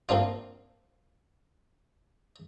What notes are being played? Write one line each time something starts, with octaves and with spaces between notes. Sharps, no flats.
A#3 C4 D4 F4